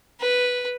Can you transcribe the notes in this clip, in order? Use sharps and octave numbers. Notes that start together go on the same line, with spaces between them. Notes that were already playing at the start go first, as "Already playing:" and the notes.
B4